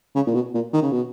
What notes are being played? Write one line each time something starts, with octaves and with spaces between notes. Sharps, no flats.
C#3
A#2
B2
A#2
D#3
C#3
B2